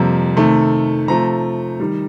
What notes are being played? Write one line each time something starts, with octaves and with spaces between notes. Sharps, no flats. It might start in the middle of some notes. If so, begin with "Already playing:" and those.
Already playing: F2 C3 G3 A#3
C3 D#3 A3
C3 F3 A3 A#5
D#3 G3